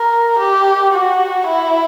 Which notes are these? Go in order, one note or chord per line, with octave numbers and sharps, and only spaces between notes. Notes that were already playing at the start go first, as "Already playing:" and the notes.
Already playing: A#4
G4
F#4
E4